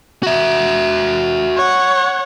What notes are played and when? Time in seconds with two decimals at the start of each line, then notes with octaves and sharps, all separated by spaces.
0.23 F#4 E5
1.57 C#5 F#5